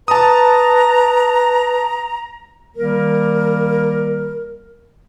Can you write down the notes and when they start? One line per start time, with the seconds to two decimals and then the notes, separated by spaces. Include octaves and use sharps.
0.08 B4 A5 A#5 D#6
2.77 D#3 G3 A#3 A#4